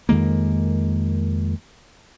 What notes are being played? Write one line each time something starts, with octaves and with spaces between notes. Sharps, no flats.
F2 D#3 G#3 A#3